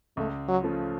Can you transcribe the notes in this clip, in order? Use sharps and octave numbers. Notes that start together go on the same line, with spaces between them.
C#2 A3
F#3
C#3 F3 A3 F4